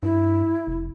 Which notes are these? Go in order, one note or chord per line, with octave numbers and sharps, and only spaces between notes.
G2 E4
F1